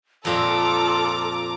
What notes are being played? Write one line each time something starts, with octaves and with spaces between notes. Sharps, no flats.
F2 A#2 F4 A4 E5 A#5 D6